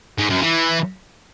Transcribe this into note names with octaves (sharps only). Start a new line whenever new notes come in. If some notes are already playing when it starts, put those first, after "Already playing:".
G#2
F#2
E3